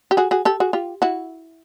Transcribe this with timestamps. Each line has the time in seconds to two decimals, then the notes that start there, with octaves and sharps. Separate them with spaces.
0.11 G4
0.17 F#4 G#4
0.31 F#4 G#4
0.45 G4 A4
0.60 F#4 G#4
0.73 F4 G4
1.02 E4 F#4